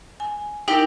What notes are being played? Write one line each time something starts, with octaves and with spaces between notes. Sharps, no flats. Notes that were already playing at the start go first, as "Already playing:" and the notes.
G#5
D#4 E4 G4 A#4